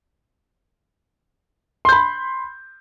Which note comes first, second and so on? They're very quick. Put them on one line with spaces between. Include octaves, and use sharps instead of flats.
C6 G6 B5